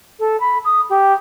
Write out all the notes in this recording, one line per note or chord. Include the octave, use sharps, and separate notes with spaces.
A4
B5
D#6
G4